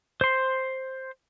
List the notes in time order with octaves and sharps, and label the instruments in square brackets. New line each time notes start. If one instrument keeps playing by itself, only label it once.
[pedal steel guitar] C5 C6